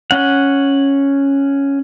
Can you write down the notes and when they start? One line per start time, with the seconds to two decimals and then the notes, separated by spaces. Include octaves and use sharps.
0.11 C#4 F#5